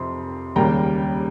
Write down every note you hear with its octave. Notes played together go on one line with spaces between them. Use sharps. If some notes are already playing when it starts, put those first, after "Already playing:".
Already playing: F2 C3 C6
D#2 C#3 G3 A#3 G5 A#5